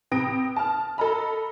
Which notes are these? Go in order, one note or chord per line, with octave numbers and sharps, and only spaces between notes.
C3 B4 G5 D#6 A#6 D7
A5 F6
A4 D#5 A#5 B5